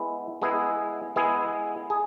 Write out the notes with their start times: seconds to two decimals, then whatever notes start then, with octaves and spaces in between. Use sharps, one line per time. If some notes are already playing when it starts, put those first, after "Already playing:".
Already playing: G#3 B3 E4
0.42 G#3 B3 E4 G#4
1.16 G#3 B3 E4 G#4
1.90 G#4